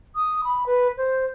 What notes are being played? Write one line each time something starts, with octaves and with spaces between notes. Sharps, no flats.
D#6
B5
B4
C5